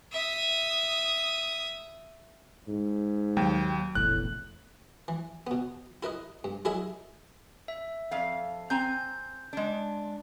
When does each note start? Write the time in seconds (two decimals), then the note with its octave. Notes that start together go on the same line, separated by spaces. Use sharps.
0.12 E5 D#6
2.68 G#2
3.37 D#2 F#3 G5
3.95 F1 A#1 E2 A2 F#6
5.08 E3
5.47 B2 B3
6.03 E4 A#4 B4 D#5
6.44 G2
6.65 F#3 E4 G#4 A#4 D#5 E5
7.68 E5
8.11 F2 F5
8.70 C4 G#5 A#5 G6
9.53 G#3 D4